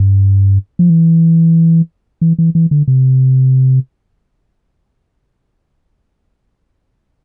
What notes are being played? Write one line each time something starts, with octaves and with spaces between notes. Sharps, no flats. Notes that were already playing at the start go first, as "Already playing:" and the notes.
Already playing: G2
F3
E3
E3
E3
E3
D3
C3